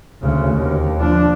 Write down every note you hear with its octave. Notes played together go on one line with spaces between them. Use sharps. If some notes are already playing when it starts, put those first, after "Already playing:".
D2 C#3
D#2
F3 D4